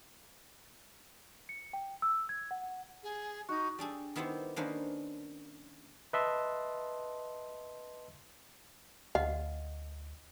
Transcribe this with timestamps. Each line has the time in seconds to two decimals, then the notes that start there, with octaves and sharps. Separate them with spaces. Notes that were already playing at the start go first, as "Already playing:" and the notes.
1.49 C#7
1.73 G5
2.02 E6
2.29 G#6
2.51 F#5
3.03 G#4
3.49 D#4 F#4
3.79 G3 D4 G#4 A4
4.16 D#3 B3 E4 G4 C5
4.56 D#3 A#3 C#4 D4 B4 C5
6.13 B4 D#5 E5 A5 C6
9.15 D2 D#5 F5 F#5